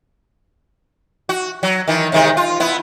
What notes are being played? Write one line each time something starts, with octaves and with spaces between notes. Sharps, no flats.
F#4
F#3
D#3 E3
C3 D#3 G#3
F4
B3 E4